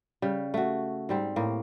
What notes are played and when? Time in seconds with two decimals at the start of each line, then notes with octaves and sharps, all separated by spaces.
0.22 C#3 G3
0.54 A3 F#4
1.09 G#2 G3 C4
1.36 A2 A#3